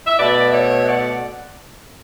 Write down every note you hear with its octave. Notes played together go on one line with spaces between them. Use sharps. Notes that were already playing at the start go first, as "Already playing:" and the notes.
E5
B2 A3 B4 D5
C#5 E5
D5 F#5